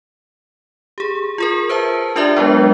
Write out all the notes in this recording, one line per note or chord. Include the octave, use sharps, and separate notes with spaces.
G4 G#4
F4 G#4 A#4
B4 C5 E5 A5
D4 F4 G4 A#4 D5 E5
F#3 G#3 B3 D4